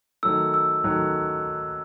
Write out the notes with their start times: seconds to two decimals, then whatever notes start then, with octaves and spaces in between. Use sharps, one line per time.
0.23 D#3 F#3 A3 E6
0.54 E6
0.84 D#3 F#3 A3 F#6